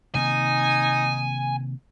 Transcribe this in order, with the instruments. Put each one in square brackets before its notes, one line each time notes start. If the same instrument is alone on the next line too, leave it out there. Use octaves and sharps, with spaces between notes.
[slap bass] C3 D#3 A#3 [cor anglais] D#4 [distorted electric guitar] G#5